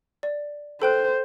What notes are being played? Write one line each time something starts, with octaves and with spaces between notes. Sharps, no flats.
D5
A4 C5 G5 F#6